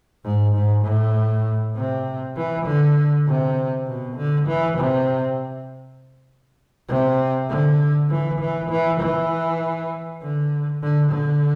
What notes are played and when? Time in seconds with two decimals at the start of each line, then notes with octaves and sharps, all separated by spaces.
0.24 G#2
0.54 G#2
0.84 A2
1.76 C3
2.36 E3
2.66 D3
3.27 C3
3.86 B2
4.17 D3
4.47 E3
4.78 C3
6.88 C3
7.49 D3
8.10 E3
8.40 E3
8.70 E3
9.00 E3
10.22 D3
10.82 D3
11.11 D3